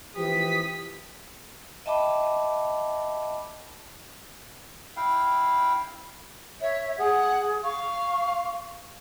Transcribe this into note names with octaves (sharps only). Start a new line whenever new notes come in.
E3 F3 G4 D#6 B6
D#5 E5 G5 A5 B5 D6
E4 F5 G5
C#5 E5
G#4 F#5
F5 C#6